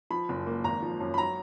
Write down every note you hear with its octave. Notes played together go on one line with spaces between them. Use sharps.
F3 B5
F#1
A#3
G#1 A#5
F3
F#2
B5
F#3 A#5